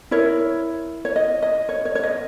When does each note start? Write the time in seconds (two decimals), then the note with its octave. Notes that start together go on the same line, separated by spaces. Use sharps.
0.11 E4 A#4 C#5
1.05 C#5
1.16 D#5
1.42 D#5
1.69 C#5
1.85 C#5
1.95 C#5
2.03 D#5